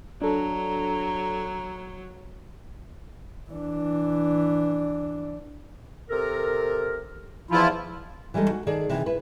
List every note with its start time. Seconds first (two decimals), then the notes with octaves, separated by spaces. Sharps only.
0.22 F#3 D4 A4 A#5
3.51 E3 D4
6.10 C3 A4 A#4
7.51 E2 E3 F3 E4 F4
8.34 E3 G3 G#3 D#4 A4
8.50 F#4
8.67 D#3 G#4 A4 D5
8.89 C3 D#3 E3 G#4
9.06 E4 B4